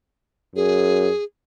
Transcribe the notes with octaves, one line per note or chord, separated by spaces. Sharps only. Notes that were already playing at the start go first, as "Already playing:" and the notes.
F#2 G#4